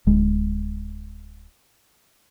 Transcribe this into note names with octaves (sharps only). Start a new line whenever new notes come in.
D1 G#3